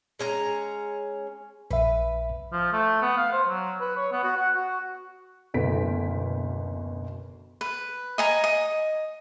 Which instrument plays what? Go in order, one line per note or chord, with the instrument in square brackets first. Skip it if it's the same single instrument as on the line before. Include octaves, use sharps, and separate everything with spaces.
[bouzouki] G#3 C#4 A#5
[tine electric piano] A#1 E5 [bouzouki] B4
[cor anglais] F3
A3
B3
F5
C5
F#3
B4
C#5
B3
F#4
F#5
F#4
[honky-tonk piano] F#1 D2 B2 B3 B6 D7
[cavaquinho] B4
D#5 G#5 A#5
D#5